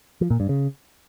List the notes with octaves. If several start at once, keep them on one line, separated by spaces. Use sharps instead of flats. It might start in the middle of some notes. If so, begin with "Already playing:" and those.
F3
A#2
G2
C#3